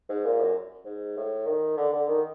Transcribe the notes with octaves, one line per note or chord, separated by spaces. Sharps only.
G#2
A#2
F#2
G#2
A2
D#3
D3
D3
D#3